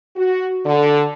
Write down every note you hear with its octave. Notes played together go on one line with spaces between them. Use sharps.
F#4
D3